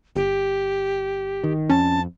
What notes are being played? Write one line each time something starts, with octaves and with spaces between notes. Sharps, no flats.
G1 G4
D#3
F2 C#4 A5